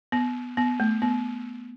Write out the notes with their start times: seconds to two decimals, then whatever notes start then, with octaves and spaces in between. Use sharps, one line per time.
0.12 B3
0.57 B3
0.80 A3
1.02 B3